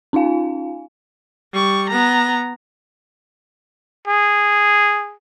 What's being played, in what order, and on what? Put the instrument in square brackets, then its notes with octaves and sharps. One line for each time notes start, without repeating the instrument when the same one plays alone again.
[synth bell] C#4 D#4 F4 F5 G#5
[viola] G3 C#6
B3 A#5
[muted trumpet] G#4